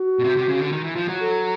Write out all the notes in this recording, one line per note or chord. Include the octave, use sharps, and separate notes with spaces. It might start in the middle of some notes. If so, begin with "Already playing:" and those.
Already playing: F#4
B2
C3
C3
C#3
D3
D#3
E3
F3
F#3
A4